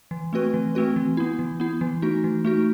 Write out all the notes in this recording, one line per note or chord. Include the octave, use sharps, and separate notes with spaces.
E3
A3 C4 F#4 B4
E3
A3 C4 F#4 B4
E3
B3 E4
E3
B3 E4
E3
A3 D#4 F#4
E3
A3 D#4 F#4